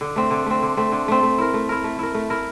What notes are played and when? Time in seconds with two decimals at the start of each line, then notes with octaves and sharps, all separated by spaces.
0.01 D3
0.16 A3 C4
0.30 D3
0.46 A3 C4
0.62 D3
0.77 A3 C4
0.92 D3
1.08 A3 C4
1.23 A3
1.38 E4 A#4
1.54 A3
1.69 E4 A#4
1.84 A3
1.99 E4 A#4
2.15 A3
2.30 E4 A#4